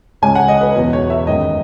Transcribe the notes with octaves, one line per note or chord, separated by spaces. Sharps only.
C#2 C#3 G#3 C#4 G#5
F#5
D#5
B4
E1 E2 B2 F#3 B4
C#5
E5
F#1 F#2 D#3 G#3 B3 D#5